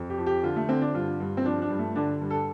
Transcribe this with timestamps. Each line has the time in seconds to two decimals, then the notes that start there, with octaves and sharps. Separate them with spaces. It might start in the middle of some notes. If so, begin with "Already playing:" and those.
Already playing: F2
0.10 G4
0.18 F3
0.26 G4
0.43 D3 F4
0.56 A3
0.69 D3 C4
0.82 D4
0.95 G2 F4
1.20 G2
1.37 C4
1.45 F3 D4
1.62 D4
1.70 G2
1.79 A3
1.96 D3 D4
2.22 G2
2.30 A4